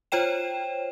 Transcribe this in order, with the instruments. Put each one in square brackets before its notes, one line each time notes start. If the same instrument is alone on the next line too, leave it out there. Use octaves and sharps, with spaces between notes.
[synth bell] F4 C5 C#5 G5 E7